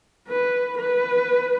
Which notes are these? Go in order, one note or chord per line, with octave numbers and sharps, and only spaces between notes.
B4
B4